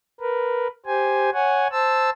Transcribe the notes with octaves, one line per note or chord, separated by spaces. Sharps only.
A#4 B4
G4 C5 G#5
C#5 F#5 G#5
C5 A5 E6